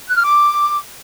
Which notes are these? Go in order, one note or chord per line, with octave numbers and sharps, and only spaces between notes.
F#6
F6
D6